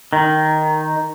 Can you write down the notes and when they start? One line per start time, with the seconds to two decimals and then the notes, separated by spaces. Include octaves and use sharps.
0.13 D#3